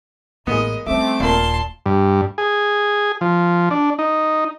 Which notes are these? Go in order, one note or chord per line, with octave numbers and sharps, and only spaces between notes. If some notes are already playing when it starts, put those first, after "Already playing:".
A1 G#3 A#3 B3 D#5
G3 A3 C4 C#4 E5 D6
D#1 A#2 A#4 A5 C6
G2
G#4
F3
D4
D#4